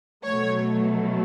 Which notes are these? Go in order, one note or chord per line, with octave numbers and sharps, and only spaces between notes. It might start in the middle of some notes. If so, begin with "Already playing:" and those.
B2 F#3 A3 C#5